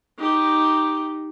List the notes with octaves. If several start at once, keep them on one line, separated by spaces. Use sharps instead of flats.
D#4 G4